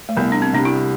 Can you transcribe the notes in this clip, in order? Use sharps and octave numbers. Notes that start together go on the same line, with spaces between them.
A3
C2 B3
D4
C4
C3 G3 D4
E4